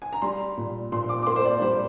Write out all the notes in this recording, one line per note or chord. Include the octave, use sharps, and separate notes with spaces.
G#5
A#5
G3 C6
A#2
A#2 C6
D6
D6
A#3 C6
C5
D5
G3 C5